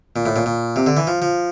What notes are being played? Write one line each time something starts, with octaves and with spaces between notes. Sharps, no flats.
A#2
A2
A#2
A#2
C3
D3
E3
F3
F3